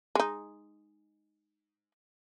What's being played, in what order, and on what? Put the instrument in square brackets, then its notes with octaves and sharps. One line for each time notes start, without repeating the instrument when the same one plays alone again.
[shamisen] G#3 D#4